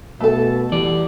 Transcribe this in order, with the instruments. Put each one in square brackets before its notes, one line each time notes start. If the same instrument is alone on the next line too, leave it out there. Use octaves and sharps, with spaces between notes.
[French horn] B2 [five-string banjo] A3 A4
[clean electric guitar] E3 D5 [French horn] G3